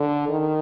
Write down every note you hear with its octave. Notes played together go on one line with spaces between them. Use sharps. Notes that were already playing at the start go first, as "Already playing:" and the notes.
Already playing: D3
D#3